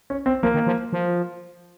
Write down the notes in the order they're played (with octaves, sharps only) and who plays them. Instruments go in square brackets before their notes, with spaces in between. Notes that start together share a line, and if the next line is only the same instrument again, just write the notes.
[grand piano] C#4
C4
[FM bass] F3 [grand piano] A#3
[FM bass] D#3
F3
F3